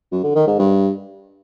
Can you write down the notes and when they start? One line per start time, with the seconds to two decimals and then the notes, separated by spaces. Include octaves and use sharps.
0.12 F#2
0.23 D3
0.35 D#3
0.47 G#2
0.59 G2